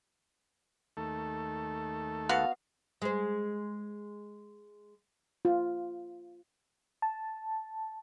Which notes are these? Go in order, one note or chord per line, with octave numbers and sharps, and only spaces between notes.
D#2 A3 A4
B3 F#4 F5
G#3 C5
F4
A5